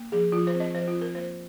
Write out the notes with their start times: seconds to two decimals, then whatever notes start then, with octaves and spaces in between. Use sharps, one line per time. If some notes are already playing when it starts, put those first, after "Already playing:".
Already playing: A#3
0.12 F3 G#4
0.32 F3 F4
0.47 C5
0.54 C4
0.60 D#5
0.74 F3 C5
0.88 F4
0.95 C4
1.01 A#4
1.15 A#3 C5